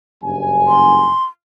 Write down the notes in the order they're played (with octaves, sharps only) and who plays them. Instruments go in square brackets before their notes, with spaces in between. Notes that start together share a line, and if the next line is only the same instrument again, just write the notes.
[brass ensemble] F#1 G2 G#5
[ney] C6